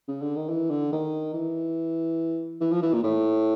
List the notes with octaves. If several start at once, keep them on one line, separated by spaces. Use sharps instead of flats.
C#3
D3
D#3
E3
D3
D#3
E3
E3
F3
E3
A#2
A2